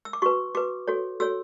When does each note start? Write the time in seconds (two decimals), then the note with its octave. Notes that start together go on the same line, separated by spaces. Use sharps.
0.05 E6
0.13 D6
0.22 F#4 B4 C#6
0.55 F#4 B4 D6
0.88 F#4 A4 C#5
1.20 F#4 A4 C#5 E6